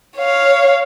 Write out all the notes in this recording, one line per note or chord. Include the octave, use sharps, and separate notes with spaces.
C#5 F5